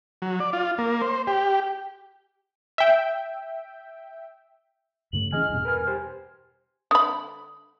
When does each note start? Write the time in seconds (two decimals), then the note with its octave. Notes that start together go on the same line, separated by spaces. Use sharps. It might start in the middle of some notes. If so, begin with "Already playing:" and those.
0.22 F#3
0.40 D5
0.53 F4
0.78 A#3
1.02 C5
1.27 G4
2.78 E5 G5
5.13 G2 C#3 A3 F#7
5.32 E3 B3 C#4 G#4 D#5 G#5 F6
5.49 E2 G2 B2
5.65 A#4 B4 G#5
5.86 G4 C5 G#5
6.91 D3 B5 D#6